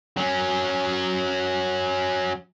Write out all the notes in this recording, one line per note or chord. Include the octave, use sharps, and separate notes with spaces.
F#3 C#4